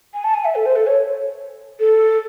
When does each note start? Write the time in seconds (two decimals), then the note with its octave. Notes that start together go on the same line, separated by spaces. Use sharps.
0.14 G#5
0.24 A5
0.34 G#5
0.45 E5
0.55 A4
0.66 C5
0.76 A4
0.87 C#5
1.80 A4